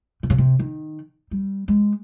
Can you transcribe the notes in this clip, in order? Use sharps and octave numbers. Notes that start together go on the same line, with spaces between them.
C3
C#3
C3
D#3
G3
G#3